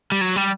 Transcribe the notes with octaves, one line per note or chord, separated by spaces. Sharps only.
G3
F#3
G3